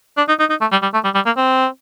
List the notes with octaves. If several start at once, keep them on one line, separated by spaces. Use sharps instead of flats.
D4
D#4
D#4
D#4
A3
G3
G3
A3
G3
G3
A#3
C4